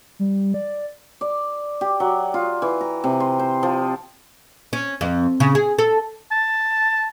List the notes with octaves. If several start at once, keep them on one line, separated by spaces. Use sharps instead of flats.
G3
D5
D5
G4
F#3
F4
E3
A#5
C3
C6
C5
F3
C#4
F2
C#3
G#4
A4
A5